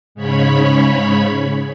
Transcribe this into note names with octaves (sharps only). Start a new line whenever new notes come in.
G#2 C#3 C#5 B5